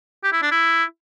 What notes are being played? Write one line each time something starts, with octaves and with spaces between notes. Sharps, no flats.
G4
E4
D4
E4